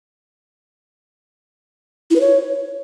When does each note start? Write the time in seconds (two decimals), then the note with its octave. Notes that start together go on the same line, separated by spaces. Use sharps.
2.11 E4
2.16 B4
2.21 C#5